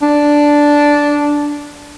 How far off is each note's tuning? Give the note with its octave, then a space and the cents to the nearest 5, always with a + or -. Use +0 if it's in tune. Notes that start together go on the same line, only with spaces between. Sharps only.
D4 -5